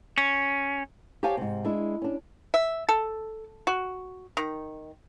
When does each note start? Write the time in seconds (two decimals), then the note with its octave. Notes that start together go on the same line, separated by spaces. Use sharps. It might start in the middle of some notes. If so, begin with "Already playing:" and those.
0.18 C#4
1.23 G4 C5 C#5 F5 G#5 A5
1.37 G#2 C3
1.65 G#3 D4 E4
2.02 C#4 D4
2.54 E5
2.89 A4
3.67 F#4
4.37 D#3